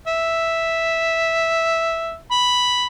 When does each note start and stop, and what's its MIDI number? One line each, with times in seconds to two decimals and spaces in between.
0.08 2.15 76
2.32 2.85 83